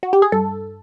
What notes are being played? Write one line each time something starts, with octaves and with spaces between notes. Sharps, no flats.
F#4
G4
G#4
G2 A4